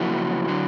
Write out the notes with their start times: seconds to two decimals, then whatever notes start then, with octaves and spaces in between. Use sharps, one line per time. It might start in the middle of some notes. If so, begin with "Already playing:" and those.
Already playing: F#2 C#3 F3 A#3 E4 F#4
0.48 D3 F#3